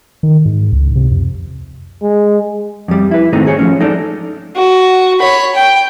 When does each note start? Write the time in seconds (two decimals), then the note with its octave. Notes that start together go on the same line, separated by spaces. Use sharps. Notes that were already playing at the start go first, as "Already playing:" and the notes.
0.23 D#3
0.45 G#2
0.73 C#2
0.95 C3
1.11 F2
2.02 G#3
2.88 F2 G3
3.11 E4 B4
3.33 G#2 D#3 A3 C4 D#4
3.47 G#4 C#5
3.59 F3 A3 C#4
3.80 G#3 D#4 A4 D5
4.56 F#4
5.20 C#5 B5
5.55 G5